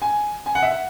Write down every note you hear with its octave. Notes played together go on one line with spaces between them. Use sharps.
G#5
G#5
F#5
E5
F#5